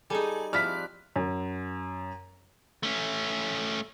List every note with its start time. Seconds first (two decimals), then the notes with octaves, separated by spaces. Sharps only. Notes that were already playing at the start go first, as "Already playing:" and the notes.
0.10 G3 D#4 G#4 A4 G#5
0.53 F3 G3 C4 E4 D5 F6 F#6 B6
1.16 F#2
2.83 A3 C#4